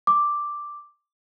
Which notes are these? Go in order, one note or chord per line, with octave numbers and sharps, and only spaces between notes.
D6